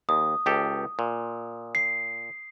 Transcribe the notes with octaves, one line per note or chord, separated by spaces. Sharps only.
D#2 D#6
C#2 G4 A4
A#2
C7